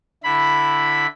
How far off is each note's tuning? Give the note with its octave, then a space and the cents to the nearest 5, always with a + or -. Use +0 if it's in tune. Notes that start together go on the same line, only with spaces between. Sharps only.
D3 +0 E4 +0 B5 +0